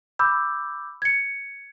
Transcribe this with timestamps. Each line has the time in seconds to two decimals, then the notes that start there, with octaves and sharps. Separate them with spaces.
0.19 B5 D6 E6 G6
1.02 G#6 C#7